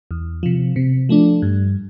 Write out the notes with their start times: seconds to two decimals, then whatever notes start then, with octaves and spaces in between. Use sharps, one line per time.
0.11 E2
0.43 C3 F3
0.76 C3
1.09 F3 A3 D4
1.42 G2